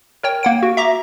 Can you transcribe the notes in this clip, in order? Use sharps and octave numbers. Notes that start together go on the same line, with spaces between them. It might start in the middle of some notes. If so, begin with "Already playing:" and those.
A#4 C#5 G5
A#3 F#5 D7
F#4
E5 A#5 D6 A#6